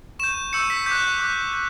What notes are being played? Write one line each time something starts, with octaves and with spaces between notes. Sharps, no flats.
C#6 G6 E7
C#6 E6 G6 C#7
B6
D6 F#6 G6
D6 F#6
G6